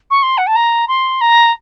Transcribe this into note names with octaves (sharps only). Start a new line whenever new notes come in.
C#6
C6
F#5
A5
A#5
C6
A#5